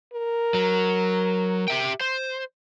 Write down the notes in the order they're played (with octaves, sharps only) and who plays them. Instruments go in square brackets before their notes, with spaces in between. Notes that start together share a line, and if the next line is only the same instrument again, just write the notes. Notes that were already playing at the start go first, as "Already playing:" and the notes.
[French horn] A#4
[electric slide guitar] F#3
G4 E5 G5
C5